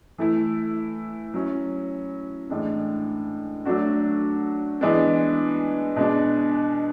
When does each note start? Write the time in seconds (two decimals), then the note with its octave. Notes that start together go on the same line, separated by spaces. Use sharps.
0.18 E3 A3 E4
1.34 F#3 C#4 E4
2.50 A2 E3 G#3 D4
3.65 F#3 A3 D4 F#4
4.81 E3 G#3 B3 D4
5.96 B2 G#3 D4